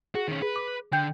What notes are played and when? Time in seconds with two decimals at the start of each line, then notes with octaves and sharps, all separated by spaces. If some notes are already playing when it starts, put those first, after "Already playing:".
0.15 F#4 G#4
0.28 D#3 C#4
0.42 G#4 B4
0.56 D6
0.93 D3 G5 G6